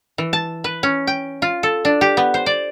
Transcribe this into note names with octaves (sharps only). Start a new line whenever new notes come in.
E3
A5
B4
C#4
G5
F4
A4
D4
G4
B3
C5
D5